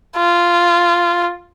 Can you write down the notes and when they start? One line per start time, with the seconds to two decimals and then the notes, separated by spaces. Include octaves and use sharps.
0.17 F4